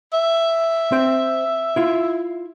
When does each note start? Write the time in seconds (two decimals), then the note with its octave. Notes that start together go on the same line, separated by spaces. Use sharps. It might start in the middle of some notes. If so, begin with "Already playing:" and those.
0.13 E5
0.92 C4 C5 G5
1.76 E4 F4